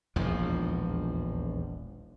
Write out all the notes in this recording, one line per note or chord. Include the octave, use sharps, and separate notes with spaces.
E1 A#1 D#2 F3